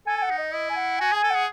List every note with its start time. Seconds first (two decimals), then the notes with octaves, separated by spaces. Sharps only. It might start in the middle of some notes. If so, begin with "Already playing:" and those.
0.07 A4 G#5
0.17 G#5
0.23 F#5
0.30 D#4
0.38 D#5
0.53 E4 D#5
0.70 G#5
0.76 F#5
1.00 F#4 G#5
1.12 G#4 G#5
1.23 A4
1.30 G#4 F#5